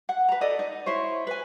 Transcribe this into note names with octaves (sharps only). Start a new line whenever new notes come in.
F#5
B4 A#5
A4 D5 D#5
D#4
E4 C5 C#5
B4 G#5